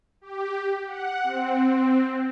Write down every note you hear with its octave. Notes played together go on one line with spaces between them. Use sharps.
G4
F#5
C4